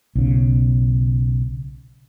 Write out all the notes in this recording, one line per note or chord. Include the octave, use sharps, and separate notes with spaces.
B1 C#3